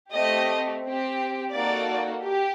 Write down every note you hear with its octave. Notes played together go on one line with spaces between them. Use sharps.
A3 C4 G4 D#5
C4 G4
A#3 D#4 F#4 A4 D5
G4